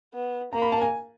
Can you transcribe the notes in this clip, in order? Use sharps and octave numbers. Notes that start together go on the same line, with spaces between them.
B3
A#3 A#5
B5
A5
G#5